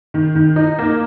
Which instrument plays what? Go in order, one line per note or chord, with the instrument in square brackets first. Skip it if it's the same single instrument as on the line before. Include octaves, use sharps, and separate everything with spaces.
[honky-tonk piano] D#3
D#3
D#4
A#3